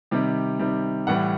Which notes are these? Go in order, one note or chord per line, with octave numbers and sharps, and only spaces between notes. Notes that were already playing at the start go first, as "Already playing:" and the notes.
C3 D#3 G3
C3 D#3 G3
A2 E3 G3 F#5